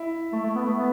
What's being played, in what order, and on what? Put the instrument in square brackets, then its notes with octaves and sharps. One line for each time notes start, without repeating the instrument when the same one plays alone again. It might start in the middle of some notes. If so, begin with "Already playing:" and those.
Already playing: [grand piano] E4
[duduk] A3
A3
B3
A3
B3